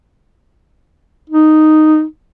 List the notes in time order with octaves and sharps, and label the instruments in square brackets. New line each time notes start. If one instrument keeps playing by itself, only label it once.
[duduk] D#4